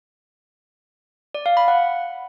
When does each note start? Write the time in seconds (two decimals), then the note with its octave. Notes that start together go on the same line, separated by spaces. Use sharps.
1.35 D5
1.46 F5
1.57 B5
1.68 F#5